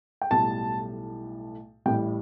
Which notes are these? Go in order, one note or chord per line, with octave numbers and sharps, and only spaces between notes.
G5
B1 A2 G3 A5
A1 A2 G3 G5